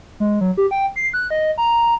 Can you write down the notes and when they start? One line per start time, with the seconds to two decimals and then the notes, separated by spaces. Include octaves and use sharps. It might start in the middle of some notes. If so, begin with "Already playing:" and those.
0.20 G#3
0.41 F#3
0.57 G4
0.71 G5
0.96 C7
1.13 F#6
1.30 D#5
1.58 A#5